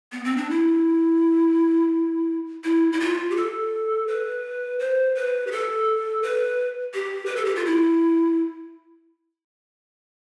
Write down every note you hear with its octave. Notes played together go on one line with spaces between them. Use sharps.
B3
C4
D4
E4
E4
E4
F4
G4
A4
B4
C5
B4
G4
A4
B4
G4
B4
A4
G4
F4
E4